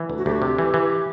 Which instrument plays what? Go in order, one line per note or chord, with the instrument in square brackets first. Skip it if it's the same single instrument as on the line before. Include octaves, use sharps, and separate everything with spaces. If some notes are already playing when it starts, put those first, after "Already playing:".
Already playing: [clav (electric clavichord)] E3
D2
[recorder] F#4
[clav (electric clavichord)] D2 [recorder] G4
[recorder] F#4
[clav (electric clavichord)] C3 [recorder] G4
[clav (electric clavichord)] E3
E3